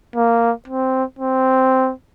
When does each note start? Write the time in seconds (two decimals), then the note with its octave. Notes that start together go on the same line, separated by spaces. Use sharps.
0.16 A#3
0.67 C4
1.19 C4